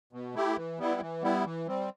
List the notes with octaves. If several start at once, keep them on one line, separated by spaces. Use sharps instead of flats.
B2
A3 E4 G4
E3
G3 B3 E4
E3
G3 B3 E4
E3
G3 C4